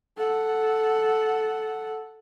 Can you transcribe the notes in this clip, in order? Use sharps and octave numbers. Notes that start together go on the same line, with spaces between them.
A4 F#5